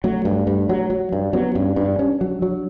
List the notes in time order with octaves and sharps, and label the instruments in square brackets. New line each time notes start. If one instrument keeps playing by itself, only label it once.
[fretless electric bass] F#3 [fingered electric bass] A3
[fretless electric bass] G2
G2
F#3
F#3
G2
[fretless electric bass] F#3 [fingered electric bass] B3
[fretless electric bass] G2 [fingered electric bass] C#4
[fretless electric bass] G2 [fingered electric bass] D4
[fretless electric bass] C#4
F#3
F#3